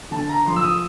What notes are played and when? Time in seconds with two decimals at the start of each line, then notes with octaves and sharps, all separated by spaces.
0.11 D3 A5
0.29 A#5
0.46 F3 C6
0.56 E6
0.64 D#6